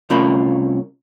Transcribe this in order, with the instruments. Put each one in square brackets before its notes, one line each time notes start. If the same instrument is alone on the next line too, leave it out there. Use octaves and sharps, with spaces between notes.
[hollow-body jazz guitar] C2 A3 C#4 F4 A#4 B5